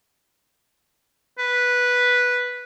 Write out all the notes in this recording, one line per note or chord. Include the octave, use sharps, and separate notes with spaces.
B4